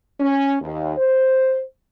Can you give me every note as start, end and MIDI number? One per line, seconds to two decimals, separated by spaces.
0.20 0.56 61
0.61 0.97 39
0.97 1.61 72